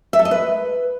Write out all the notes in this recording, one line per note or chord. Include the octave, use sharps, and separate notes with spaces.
E5
A4
D#5
B4